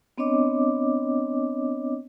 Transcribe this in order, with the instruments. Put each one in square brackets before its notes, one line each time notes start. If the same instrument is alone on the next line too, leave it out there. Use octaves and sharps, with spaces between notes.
[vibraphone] B3 C4 D4 C#5 D#5 D6